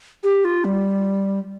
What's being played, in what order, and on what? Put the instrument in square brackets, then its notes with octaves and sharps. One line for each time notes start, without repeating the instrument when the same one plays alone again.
[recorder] G4
F4
G3